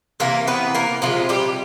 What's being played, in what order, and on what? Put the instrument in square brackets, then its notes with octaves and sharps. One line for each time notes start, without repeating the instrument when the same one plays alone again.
[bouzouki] C3 E3 A#3 A#4
B3 B4
A#3 A#4
C3 E3 F3 G#3 F4
G3 G4